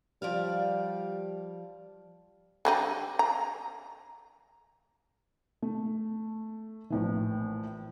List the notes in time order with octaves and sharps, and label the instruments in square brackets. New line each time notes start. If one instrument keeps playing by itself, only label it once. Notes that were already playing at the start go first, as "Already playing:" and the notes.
[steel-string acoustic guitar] F3 D5 F5 [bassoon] G3
[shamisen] D3 G3 D#4
A#5
[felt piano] A3
A#1 A2 E3